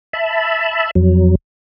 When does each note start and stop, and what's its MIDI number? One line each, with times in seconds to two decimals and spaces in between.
0.13 0.91 76
0.13 0.91 81
0.13 0.91 83
0.95 1.35 41
0.95 1.35 54